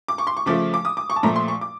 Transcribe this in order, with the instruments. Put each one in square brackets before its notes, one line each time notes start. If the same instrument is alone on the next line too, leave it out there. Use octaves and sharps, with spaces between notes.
[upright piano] D6
C#6
C6
C#6
C#3 F3 A3 D6
D6
D#6
D6
C#6
A5
A#2 F3 A3 A#5
C6
C#6
D6